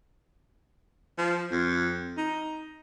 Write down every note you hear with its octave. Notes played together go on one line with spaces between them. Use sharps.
F3
F2
D#4